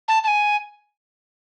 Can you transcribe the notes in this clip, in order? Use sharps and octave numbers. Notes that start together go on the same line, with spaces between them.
A5
A5
G#5